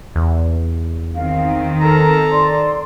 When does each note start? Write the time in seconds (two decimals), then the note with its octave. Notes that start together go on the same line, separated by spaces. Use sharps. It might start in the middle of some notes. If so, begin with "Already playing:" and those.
0.15 E2
1.15 D#3 C4 F5
1.80 A4 A#4 A#5
2.32 D5 C6